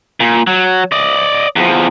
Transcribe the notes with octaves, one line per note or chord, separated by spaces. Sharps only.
A#2
F#3
D5 D#5
E2 F3